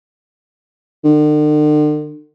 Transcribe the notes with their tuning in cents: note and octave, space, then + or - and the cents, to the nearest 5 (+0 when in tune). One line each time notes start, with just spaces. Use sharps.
D3 +45